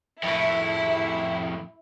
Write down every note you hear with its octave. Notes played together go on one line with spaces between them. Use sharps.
F2 A2 E4